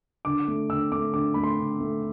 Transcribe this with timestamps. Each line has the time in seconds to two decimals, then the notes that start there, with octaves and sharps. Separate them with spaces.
0.25 D3 D6
0.48 A3
0.69 D3 E6
0.92 A3 D6
1.14 D3 D6
1.34 A3 B5
1.43 C6
1.58 D3
1.80 A3